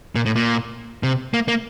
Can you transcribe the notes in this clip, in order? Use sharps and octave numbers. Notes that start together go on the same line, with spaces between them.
A#2
A2
A#2
C3
A#3
A#3